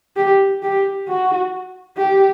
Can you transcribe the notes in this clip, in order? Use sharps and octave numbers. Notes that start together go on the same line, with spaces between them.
G4
G4
F#4
G4